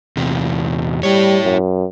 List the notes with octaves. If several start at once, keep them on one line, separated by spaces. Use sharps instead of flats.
E2 C3
G3 E4 C#5
F#2